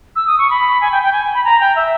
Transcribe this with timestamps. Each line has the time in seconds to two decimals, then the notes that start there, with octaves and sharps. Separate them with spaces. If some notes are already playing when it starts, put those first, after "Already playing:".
0.16 E6
0.27 D#6
0.39 C#6
0.50 B5
0.81 G#5
0.92 G5
1.03 G5
1.12 G#5
1.34 B5
1.45 A#5
1.60 G5
1.76 E5